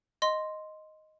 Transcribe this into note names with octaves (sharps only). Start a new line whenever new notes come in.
D#5 C6